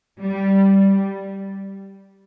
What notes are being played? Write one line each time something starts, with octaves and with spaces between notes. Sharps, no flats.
G3